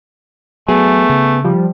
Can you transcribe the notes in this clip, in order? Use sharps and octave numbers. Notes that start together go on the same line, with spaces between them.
F#3 A3 B3 G#4 G#5
C#3
F3 G3